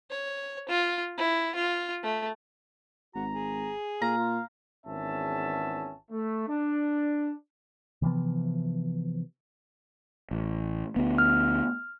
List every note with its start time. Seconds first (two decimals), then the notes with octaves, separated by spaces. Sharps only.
0.10 C#5
0.69 F4
1.18 E4
1.55 F4
2.03 A3
3.15 G#1 F#4 A#5
3.32 G#4
4.02 A#2 F5 A#5
4.18 F4
4.86 G#1 E2 C#4 E5 A5
6.11 A3
6.48 D4
8.02 C3 E3 F3 B3
10.31 A1
10.96 D2 B3
11.18 F6